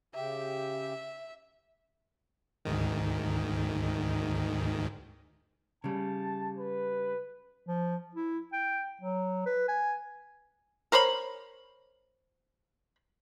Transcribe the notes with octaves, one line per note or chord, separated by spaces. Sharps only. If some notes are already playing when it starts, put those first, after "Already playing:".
C#3 G4 E5
D2 G#2 D#3
C#3 G3 A5
B4
F3
E4
G5
F#3
B4
G#5
A#4 C5 C#5 B5